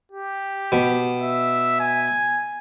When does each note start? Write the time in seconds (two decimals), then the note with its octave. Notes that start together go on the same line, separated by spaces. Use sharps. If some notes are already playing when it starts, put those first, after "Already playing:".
0.12 G4
0.72 B2
1.20 E5
1.80 G#5